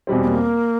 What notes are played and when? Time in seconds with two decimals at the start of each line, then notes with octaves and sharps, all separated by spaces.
0.07 E2 B2 G3 C4
0.23 B3
0.27 A#3